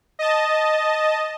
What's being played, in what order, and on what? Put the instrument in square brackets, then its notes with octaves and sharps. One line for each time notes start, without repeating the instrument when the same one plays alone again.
[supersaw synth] D#5 A5